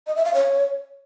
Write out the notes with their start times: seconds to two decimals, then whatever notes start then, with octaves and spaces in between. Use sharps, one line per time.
0.07 D#5
0.16 E5
0.25 F5
0.34 C#5